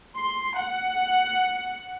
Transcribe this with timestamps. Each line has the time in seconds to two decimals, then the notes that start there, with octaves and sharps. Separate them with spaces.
0.16 C6
0.58 F#5